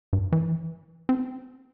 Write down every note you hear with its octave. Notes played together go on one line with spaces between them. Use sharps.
G2
E3
C4